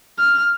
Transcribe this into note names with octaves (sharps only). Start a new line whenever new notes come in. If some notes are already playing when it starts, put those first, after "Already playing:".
F6